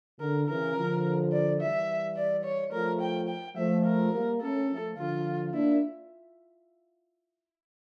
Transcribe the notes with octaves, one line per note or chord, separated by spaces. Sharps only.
D3 A#4
C#3 E3 A#4
D3 F3
D5
E3 G3 E5
D5
C#5
F3 A3 A#4
G5
G5
F3 A3 E5
A#4
G3 A#3
A3 C#4 A4
F3 A3
D3 F3 F4
A#3 D4 E4